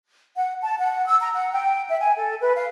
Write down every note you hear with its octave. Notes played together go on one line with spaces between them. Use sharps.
F#5
A5
F#5
E6
A#5
F#5
G5
E5
G#5
A4
B4
F5